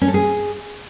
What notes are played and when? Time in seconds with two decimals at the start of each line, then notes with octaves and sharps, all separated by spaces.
0.01 C#4
0.08 A4
0.14 G#4